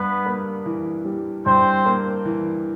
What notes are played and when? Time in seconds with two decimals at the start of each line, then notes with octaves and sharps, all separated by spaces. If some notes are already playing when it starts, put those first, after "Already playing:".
Already playing: G2 B3 B4
0.25 A#3
0.66 E3
1.05 G3
1.45 G2 C4 C5
1.86 A#3
2.25 E3